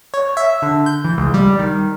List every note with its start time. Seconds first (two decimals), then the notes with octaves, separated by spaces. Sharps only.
0.14 C#5
0.37 E5
0.62 D3
0.86 G6
1.05 E3
1.18 C#2
1.34 G3
1.59 D#3